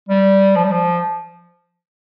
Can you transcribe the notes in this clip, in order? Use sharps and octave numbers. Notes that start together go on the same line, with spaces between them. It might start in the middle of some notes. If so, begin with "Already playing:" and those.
G3
F3
G3
F3